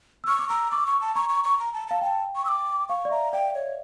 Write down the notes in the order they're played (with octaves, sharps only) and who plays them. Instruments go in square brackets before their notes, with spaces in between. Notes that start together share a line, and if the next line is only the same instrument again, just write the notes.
[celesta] E6
[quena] C#6 [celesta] F6
[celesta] D6
[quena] A#5 [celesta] E6
[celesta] C#6 [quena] D6
[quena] C#6
A5
[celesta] A#5 [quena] C#6
[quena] C#6
C#6
A#5
A5
[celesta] F5 [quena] A5
[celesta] G5 [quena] A5
[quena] C#6
E6
D6
[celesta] F5 [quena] C#6
[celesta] D5
[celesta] E5 [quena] A#5
[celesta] D5 [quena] G5
[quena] C#5